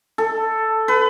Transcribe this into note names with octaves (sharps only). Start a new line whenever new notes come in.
A4
B4